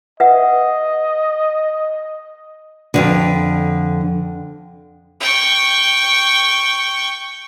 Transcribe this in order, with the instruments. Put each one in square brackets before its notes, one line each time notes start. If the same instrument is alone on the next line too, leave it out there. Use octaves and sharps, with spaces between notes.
[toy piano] B4 E5 F#5 [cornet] D#5
[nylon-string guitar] F2 G#2 D3
[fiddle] G5 C#6